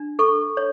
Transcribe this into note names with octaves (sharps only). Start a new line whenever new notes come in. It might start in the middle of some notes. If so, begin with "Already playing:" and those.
Already playing: D4
A4 C#6
C#5